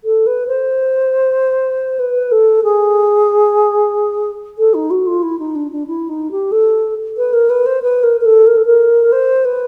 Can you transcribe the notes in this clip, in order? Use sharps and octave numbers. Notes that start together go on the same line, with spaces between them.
A4
B4
C5
B4
A4
G#4
A4
D#4
F#4
F4
E4
D#4
D4
D4
E4
D#4
G4
A4
B4
A#4
B4
C5
B4
A#4
A#4
A4
A#4
A4
A#4
C5
B4